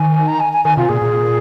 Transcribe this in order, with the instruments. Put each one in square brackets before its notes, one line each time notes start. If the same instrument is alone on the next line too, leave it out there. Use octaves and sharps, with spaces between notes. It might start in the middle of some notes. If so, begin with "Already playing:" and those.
Already playing: [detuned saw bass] D#3 [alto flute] G#5
[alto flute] A#5
G#5
G#5
[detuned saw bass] D#3 [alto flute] G#5
[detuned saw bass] C3 [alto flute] F4
[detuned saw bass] A#2 [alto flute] G#4
[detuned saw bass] A#2